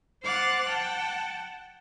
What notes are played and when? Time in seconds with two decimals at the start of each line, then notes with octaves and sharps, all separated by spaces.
0.23 C5 F#5 D6 F6 F#6 A6
0.68 F#5 G5 A5